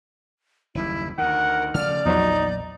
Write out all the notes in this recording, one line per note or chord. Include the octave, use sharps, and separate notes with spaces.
F#1 D#2 G3 E4
D2 D#3 A#4 F#5
C#3 F3 A3 D5 F6
A#1 E2 F3 F#3 D#4